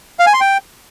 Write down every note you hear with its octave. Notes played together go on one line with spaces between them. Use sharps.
F5
G#5
C6
G5